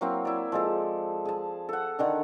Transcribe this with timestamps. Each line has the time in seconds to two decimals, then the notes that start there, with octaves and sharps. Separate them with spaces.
0.01 F#3 A#3 C4 E4
0.25 E4 D5
0.52 F3 G#3 A4
1.25 G#4 A5
1.69 A4 F#5
1.99 D3 D#3 D4